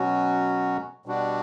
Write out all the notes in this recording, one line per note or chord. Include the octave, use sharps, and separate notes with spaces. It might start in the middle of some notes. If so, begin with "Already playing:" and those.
Already playing: B2 F#3 C#4 F#4
B2 G3 D4 F#4